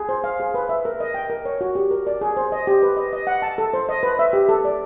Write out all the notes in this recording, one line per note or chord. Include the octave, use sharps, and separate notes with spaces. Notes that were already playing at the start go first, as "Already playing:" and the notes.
Already playing: G#4
C5
F5
G#4
B4
E5
A#4
D#5
G5
A#4
C#5
F#4
G4
A#4
D5
G#4
C5
D#5
G4
B4
D#5
D#5
F#5
A5
A4
C5
D#5
B4
E5
G4
A4
D5